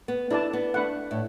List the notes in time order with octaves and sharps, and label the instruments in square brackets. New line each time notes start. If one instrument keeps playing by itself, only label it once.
[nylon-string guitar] B3
[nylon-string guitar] D4 [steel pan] E4 A4 D5 A5
[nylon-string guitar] B3
[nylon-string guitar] A3 [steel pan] D4 B4 F#5
[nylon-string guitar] A2